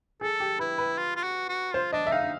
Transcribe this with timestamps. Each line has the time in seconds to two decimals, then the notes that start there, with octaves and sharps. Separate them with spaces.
0.21 G#4 A4
0.40 G4
0.59 E4 B4
0.78 B4
0.98 F4
1.16 F4
1.23 F#4
1.49 F#4
1.74 F4 C5
1.92 D4 D#5
2.07 E5
2.12 D#4 F5